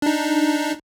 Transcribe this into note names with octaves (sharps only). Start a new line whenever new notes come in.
D4 D#4